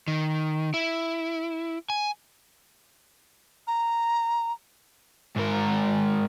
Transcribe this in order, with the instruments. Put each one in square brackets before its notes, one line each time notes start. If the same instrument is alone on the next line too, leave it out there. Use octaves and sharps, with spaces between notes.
[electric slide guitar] D#3
E4
G#5
[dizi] A#5
[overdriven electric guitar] G#2 A#4